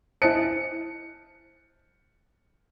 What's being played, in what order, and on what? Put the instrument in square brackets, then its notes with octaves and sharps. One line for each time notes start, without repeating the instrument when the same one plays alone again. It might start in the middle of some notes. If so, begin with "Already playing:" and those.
[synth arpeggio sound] E4 D#5 A5 [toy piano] C5 G#5 [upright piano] C#7